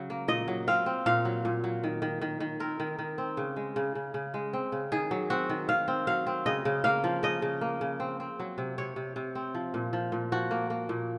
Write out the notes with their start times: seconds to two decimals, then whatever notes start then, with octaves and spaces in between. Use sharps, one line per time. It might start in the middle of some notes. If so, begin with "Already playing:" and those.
Already playing: C#3 F#3
0.10 A#3
0.28 A#2 D#5
0.48 F#3
0.67 C4 F5
0.86 C4
1.06 A#2 F5
1.25 F#3
1.45 A#2
1.64 F#3
1.84 D#3
2.02 D#3
2.21 D#3
2.40 D#3
2.60 C4 A#4
2.80 D#3
2.99 D#3
3.18 C4
3.37 C#3
3.56 G#3
3.76 C#3
3.95 C#3
4.14 C#3
4.34 G#3
4.53 C4
4.72 C#3
4.92 D#3 G#4
5.11 F#3
5.30 C4 F#4
5.49 D#3
5.69 D#3 F5
5.88 C4
6.07 F#3 F5
6.27 C4
6.46 C#3 D#5
6.65 C#3
6.84 A#3 F5
7.04 F3
7.23 C#3 D#5
7.42 C#3
7.61 A#3
7.81 C#3
8.00 C4
8.20 C4
8.40 F#3
8.58 C3
8.78 C3 C#5
8.96 C3
9.16 C3
9.35 C4
9.54 F3
9.74 A#2
9.93 F3
10.12 A#2
10.32 F3 F#4
10.51 A#3
10.70 A#3
10.89 A#2